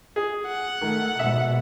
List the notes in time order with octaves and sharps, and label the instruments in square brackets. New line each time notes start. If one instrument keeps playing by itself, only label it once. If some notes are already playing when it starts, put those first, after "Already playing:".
[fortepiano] G#4
[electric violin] F#5
[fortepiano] D#3 [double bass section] A3
[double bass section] G#2 B2 [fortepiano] E5